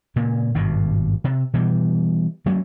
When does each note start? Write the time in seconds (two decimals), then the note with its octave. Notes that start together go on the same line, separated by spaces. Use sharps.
0.16 A#2 C#3 A#3
0.54 G#1 G2 B2
1.24 C3
1.54 B2 E3 G3
2.46 F#3 A3 A#3 C#4